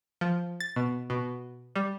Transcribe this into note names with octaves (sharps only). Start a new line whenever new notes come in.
F3
A6
B2
B2
G3